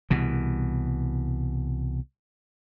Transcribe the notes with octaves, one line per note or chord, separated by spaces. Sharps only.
C2 B2 E3